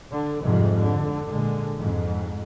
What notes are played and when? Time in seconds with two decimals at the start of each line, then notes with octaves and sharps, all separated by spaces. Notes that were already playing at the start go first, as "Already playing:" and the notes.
0.11 D3
0.41 F2 G#2 C3 F3 G3
0.78 D3
1.29 A#2 D3 G#3
1.80 F2 G#2